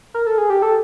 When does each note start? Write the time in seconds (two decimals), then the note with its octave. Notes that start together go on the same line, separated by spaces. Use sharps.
0.14 A#4
0.26 A4
0.38 G#4
0.50 G4
0.62 A4